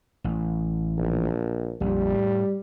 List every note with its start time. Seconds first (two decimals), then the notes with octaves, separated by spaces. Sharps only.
0.24 A1
0.97 A#1
1.81 A#1 F2 G3
2.14 A2